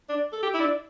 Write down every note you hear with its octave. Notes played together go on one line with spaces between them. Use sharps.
D4
A4
G4
E4
D4